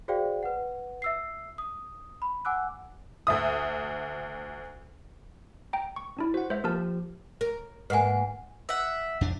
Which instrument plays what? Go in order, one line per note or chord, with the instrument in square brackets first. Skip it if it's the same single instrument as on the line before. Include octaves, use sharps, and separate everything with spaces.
[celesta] F#4 G#4 C5 D5 F5 G5
B4 F#5
E5 E6 C7
D#6
B5
F#5 G#5 D6 E6 F#6
[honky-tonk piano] D2 E5 D#6
[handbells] G5 A#5
C#6
C4 D4 E4
[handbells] F#4 [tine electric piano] C5 F#5
[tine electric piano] G#3 [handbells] C5 E5
[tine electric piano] F3 G4 [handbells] A#3 A#4 A5
[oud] A#4
[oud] G#2 A#3 [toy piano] B4 F#5 G#5
[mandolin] E5 F#5
[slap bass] F2 D4